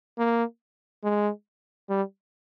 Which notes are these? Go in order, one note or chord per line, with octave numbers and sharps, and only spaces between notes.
A#3
G#3
G3